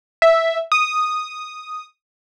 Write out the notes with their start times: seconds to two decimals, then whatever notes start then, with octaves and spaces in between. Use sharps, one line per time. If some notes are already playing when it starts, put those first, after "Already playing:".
0.22 E5
0.72 D#6